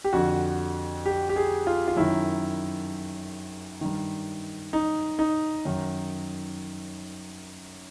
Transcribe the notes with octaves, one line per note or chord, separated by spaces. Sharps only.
G4
F2 D3 F#4
G4
G4
G#4
F4
F4
F#2 D#3 E4
G2 D#3
D#4
D#4
F#2 D#3